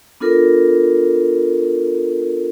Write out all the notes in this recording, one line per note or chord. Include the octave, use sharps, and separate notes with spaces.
B3 D4 F4 A4 A#4